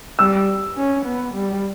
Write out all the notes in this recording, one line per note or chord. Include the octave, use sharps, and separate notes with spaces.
G3 E6
C#4
B3
G3